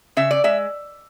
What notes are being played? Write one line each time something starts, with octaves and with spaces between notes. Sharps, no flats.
C#3 E5
D5
G#3 E5